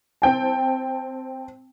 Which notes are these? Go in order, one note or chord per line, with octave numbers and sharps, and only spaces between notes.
C4 G5 A5